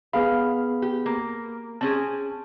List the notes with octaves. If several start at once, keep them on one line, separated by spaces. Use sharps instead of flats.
B3 G#4 F5 B5
G4
A#3
C4 C#4 G#4 A5